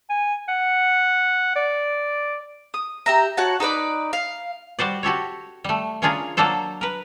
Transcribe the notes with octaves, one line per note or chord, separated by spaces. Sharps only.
G#5
F#5
D5
D#6
G4 E5 A#5
F#4 C#5 F#5 A5
D#4 A4 B4 D5
F5
G3 F#4 C5 D5
F#4 G4 A4 C#5
G3 A3
C#3 C#4 D4 F4 G#4 A#4
F#3 A#3 D4 A4 C5
A#4 B4